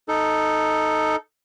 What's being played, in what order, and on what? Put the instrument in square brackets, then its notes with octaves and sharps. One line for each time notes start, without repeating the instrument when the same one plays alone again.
[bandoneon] D#4 A4